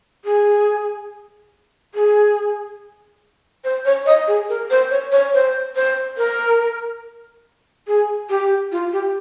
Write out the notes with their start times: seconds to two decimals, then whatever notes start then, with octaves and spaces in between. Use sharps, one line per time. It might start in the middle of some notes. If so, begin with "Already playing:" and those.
0.25 G#4
1.94 G#4
3.64 C5
3.85 C#5
4.06 D#5
4.27 G#4
4.49 A#4
4.70 C5
4.90 C#5
5.12 C#5
5.33 C5
5.75 C5
6.18 A#4
7.87 G#4
8.30 G4
8.72 F4
8.92 G4